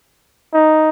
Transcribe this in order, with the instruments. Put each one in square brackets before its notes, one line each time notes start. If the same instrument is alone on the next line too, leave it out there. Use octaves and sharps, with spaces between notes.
[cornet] D#4